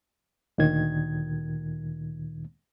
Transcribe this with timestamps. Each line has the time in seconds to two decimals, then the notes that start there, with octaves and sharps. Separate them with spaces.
0.58 D2 A#2 D#3 G#6